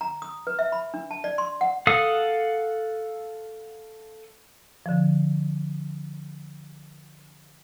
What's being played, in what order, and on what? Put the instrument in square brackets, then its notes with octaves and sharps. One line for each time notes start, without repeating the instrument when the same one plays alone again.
[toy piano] A#5
D#6
B4
E5
B5
D4
A5
D5
C6
F#5
[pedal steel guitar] A4 F5 F#5 D#6
[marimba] D3 F3